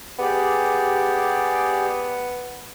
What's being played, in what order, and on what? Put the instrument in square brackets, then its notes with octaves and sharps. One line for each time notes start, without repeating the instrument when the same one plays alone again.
[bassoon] B3 [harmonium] G4 G#4 D5